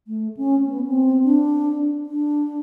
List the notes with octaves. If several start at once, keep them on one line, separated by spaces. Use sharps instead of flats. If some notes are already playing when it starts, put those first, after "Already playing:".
A3
C#4
B3
C4
D4
D4